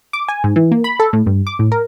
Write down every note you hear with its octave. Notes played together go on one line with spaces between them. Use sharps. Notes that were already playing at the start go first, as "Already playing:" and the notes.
D6
G#5
G#2
E3
A#3
B5
A4
A2
G2
D6
A2
A#4